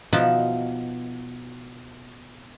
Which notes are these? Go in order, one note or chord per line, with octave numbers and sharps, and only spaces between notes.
B2 F3 D#4 F4 E5 F#5